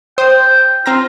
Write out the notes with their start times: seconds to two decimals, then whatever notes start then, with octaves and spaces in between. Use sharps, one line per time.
0.18 C5 G5 D#6
0.86 C4 F4 A#5 A#6